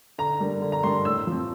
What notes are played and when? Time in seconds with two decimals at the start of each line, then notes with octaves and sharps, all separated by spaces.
0.18 D3 A#5
0.40 G3 A#3 D4
0.62 D3
0.72 A#5
0.83 G3 A#3 D4 C6
1.05 A2 E6
1.27 F3 C4